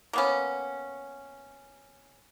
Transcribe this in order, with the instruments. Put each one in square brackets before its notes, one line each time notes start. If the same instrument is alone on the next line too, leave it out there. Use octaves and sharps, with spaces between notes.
[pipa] A#3 B3 C#4